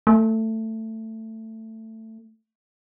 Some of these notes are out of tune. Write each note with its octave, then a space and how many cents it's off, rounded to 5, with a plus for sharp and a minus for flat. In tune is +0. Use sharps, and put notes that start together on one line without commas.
A3 +15